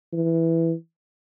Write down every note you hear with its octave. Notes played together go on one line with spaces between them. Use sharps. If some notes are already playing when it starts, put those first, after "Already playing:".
E3